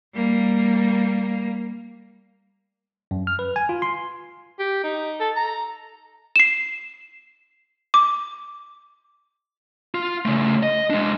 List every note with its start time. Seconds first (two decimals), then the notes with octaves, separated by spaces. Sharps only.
0.14 G3 A#3
3.11 F#2
3.27 F6
3.39 B4
3.56 G#5
3.69 F4
3.82 C6
4.59 G4
4.84 D#4
5.20 A4
5.36 A#5
6.36 C7 E7
7.94 D6
9.95 F4
10.25 C#3 A3
10.63 D#5
10.90 G#3 D4